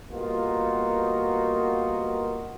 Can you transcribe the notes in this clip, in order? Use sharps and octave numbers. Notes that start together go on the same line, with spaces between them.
G3 A#3 B3 D#4 F4 F#4